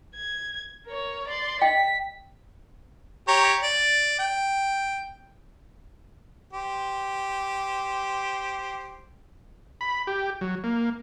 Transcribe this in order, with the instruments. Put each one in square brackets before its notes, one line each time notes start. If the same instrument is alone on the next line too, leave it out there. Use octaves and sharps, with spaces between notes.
[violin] G#6
A#4 C#5
D5 C6
[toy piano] D#5 G5 [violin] B6
[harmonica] G4 C#5 A#5
D5
G5
G4 C5
[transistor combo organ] B5
G4
F#3
A#3